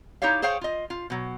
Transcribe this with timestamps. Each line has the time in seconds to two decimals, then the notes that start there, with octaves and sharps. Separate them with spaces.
0.22 D#4 E4 G4 C#5 F5
0.42 G#4 C5 C#5 F5 G5
0.61 F4 D#5
0.90 F4
1.10 B2 F#3